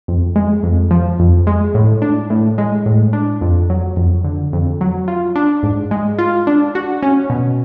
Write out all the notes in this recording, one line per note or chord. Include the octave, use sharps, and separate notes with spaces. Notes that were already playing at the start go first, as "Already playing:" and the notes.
F2
G#3
F2
F3
F2
G#3
A2
D4
A2
G#3
A2
D4
F2
F#3
F2
D3
F2
F#3
F4
D4
G#2
G#3
F4
D4
F#4
C#4
B2